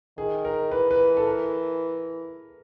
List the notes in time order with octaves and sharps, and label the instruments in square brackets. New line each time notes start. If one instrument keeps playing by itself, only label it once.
[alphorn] D#3 [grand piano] G#4
[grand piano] A#4
[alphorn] E3 [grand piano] B4
[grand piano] B4
A4
A#4